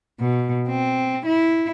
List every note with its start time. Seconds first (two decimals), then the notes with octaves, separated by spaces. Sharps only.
0.20 B2
0.69 C4
1.26 E4